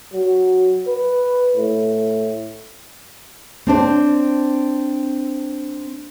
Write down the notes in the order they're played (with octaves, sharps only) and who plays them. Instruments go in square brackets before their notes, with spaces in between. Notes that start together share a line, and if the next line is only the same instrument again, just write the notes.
[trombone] F#3
B4
A2
[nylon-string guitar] C4 D4 C5